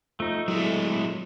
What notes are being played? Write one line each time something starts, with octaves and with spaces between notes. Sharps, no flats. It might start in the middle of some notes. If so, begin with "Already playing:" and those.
F3 A3 D#4
A2 F#3 G#3 A3